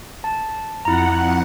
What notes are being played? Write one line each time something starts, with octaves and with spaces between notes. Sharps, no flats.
A5
F2 E4 F#5 A#5